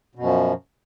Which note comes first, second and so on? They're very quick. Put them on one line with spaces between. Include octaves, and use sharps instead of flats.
B2 F#2 F3